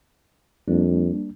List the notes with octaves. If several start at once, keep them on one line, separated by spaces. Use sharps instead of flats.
F2 G3 A#3 D4